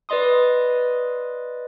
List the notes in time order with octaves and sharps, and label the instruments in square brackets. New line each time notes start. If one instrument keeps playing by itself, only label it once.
[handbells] B4 D5 D#5 C6 D#6